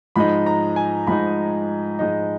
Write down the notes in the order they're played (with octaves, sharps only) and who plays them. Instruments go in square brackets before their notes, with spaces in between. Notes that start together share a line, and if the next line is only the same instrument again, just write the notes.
[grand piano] G#2 F3 G#3 D#4 B5
A#5
G#5
G#2 F3 G#3 D#4 B5
G#2 F3 G#3 D#4